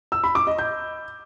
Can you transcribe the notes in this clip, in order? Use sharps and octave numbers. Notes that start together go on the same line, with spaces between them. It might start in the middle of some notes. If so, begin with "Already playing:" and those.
E6
B5
D6
D#5
G6